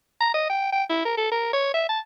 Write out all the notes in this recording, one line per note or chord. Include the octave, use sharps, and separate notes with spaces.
A#5
D#5
G5
G5
E4
A#4
A4
A#4
C#5
E5
A5